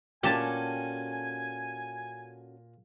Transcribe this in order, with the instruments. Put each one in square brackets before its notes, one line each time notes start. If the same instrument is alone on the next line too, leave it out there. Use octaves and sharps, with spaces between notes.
[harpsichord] A#2 [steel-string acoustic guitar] C#4 F#4 A4 [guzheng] G4 A5 [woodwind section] G#5